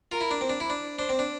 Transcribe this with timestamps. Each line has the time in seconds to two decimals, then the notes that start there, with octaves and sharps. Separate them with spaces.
0.12 F4 A#4
0.21 E4
0.31 D4
0.41 C4
0.49 D4
0.60 E4
0.70 D4
0.98 D4 C5
1.09 C4
1.19 D4